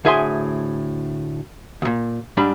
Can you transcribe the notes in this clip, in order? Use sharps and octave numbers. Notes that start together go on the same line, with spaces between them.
D2 A2 G#4 E5 G#5 C6
D2 A#2
G#2 G3 D4 B5